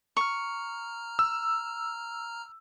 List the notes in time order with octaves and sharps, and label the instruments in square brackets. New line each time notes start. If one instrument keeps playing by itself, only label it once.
[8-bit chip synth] A#5 F6 [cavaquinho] C#6
[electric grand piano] E6